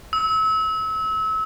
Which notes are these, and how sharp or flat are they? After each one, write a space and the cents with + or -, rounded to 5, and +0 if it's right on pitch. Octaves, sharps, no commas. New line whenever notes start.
E6 -30